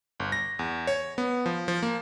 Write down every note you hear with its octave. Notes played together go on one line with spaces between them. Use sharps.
G1
A#6
E2
C#5
B3
F3
F3
A#3